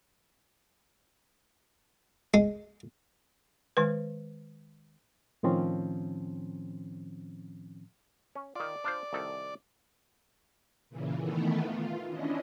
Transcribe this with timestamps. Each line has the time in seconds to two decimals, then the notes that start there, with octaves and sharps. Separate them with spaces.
2.34 G#3
3.77 D#3 G#3 B4
5.43 A2 D#3 F3 C4 C#4
8.35 C#4
8.56 D#3 F4 D5
8.84 D4 F4 C5
9.13 C2 D#3 A4
10.90 A#2 C#3 E3
11.19 D#3 E3 A3 B3
11.60 F4
12.08 C#4 D4 E4 D#5